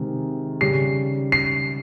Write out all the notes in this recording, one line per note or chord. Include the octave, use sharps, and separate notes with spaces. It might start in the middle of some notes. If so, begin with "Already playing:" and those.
Already playing: C3 D#3 G#3
C#3 G3 C#4 C7
C7